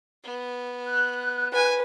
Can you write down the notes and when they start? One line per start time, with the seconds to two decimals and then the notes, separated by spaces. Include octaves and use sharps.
0.24 B3
0.86 F#6
1.54 B4 G#5